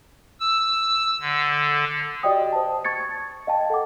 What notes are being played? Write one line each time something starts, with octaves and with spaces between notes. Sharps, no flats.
E6
D3
F#4 G4 D5 D#5 G5 D#6
C5 A5
C#6 G#6 A6 C#7
D#5 F5 G5 A5
A4 F#5 D6